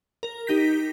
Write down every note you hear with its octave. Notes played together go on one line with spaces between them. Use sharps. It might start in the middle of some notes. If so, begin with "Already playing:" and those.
A#4
D#4 G4 G6 A#6 B6